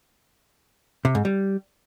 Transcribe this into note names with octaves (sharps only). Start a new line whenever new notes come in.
C3
G#2
G3